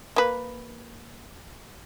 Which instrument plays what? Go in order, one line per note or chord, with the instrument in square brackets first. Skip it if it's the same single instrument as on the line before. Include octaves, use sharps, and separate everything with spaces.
[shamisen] A#3 B4